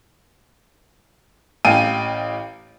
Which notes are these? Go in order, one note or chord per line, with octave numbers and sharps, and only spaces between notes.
A1 F5 G5 D#7